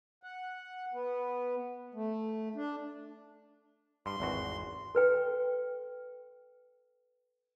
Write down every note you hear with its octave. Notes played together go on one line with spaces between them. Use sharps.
F#5
B3
A3
D4
G2 C6
G#1 E2 F#4
A4 B4 G5